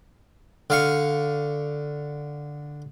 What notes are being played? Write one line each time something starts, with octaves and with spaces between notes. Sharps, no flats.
D3 F5 C#6